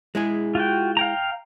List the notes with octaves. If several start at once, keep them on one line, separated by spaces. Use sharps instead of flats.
G#3 E4 G#4
F4 F#4 G5
F5 G5 A#5